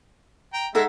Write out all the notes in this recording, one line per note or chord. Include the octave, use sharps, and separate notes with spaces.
G5 A#5
G#3 D#4 A4 E5 F#5